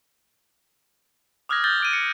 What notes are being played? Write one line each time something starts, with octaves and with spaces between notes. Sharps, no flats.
D6 D#6 F6 F#6 G#6 A#6
G6 A6 G7
D6 D7 D#7
C#7